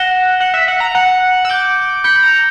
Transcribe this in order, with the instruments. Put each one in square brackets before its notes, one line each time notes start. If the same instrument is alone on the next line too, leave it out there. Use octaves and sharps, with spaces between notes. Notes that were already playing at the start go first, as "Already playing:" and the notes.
Already playing: [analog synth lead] F#5 [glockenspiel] F#6 A#6 E7 G7
[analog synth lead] F#5 [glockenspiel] F#6 C#7 F#7
[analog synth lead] E5
F#5
A#5
[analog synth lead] F#5 [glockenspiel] F#6 C#7 F#7
[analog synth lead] E6
[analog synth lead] D6 [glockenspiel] G6 C#7 G7
[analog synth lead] B5 [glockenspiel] G6 C#7 G7
[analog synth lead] B5
A#5